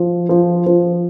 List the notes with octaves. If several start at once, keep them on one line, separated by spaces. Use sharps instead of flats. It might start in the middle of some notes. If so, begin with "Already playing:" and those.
Already playing: F3
F3
F3